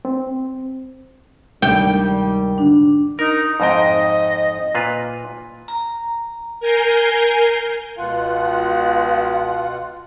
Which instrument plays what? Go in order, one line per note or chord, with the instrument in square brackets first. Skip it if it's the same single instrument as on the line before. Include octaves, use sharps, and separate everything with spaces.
[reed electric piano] C4
[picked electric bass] D2 C3 G#3 [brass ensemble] D#3 G3 [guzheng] G5
[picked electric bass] F1 G#2 D3 [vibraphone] D4
[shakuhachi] D#4 [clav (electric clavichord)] A#4
[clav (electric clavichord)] F2 G#2 G5 [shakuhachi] D#5
[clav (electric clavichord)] A#2 F4 B4
[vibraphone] A#5
[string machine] A#4 G#5 G6 C7
[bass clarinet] C#2 [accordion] B2 F4 F#5 [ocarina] F5